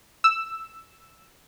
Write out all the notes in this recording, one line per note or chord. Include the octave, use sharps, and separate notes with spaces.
E6